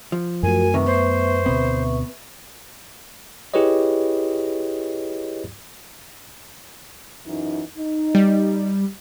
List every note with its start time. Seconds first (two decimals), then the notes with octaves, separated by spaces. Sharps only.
0.12 F3
0.43 F#2 A3 F#4 A#4 G#5
0.74 C3 D#3 B4 E5 C#6
0.86 B3 C5
1.46 D2 B2 B3 C4
3.54 E4 G4 G#4 B4 C#5 D#5
7.26 F#2 E3 D#4
7.77 D#4
8.15 G3